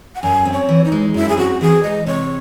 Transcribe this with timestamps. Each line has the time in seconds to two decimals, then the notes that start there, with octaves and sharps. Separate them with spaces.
0.15 F#5
0.22 F#2 G#5
0.45 C4
0.52 C#5
0.69 E3
0.84 D#4
0.92 G#3
1.14 F#2 E4
1.29 G#4
1.37 C4 F#4
1.61 E3 G#4
1.83 G#3 D#5
2.06 C3 C#5